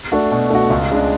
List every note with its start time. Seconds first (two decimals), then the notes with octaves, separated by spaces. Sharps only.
0.12 A3 D4 F#4
0.32 B2
0.50 A3 D4 F#4
0.70 C#2
0.91 C#3 G#3 D4